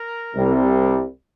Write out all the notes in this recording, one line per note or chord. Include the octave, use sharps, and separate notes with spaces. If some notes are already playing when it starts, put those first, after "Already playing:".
Already playing: A#4
C2 C3 G3